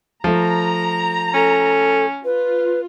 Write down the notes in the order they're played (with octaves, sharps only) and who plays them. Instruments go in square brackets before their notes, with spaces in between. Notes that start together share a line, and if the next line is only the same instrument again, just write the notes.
[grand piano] F3 A3 [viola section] A#5
[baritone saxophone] C#4 [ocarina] A4
[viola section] F4 [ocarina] B4